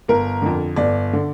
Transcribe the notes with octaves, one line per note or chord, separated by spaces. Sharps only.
G1 A#4
F2 D3
G1 D5
D3